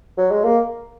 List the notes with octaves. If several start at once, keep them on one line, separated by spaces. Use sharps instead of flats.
F#3
G#3
A#3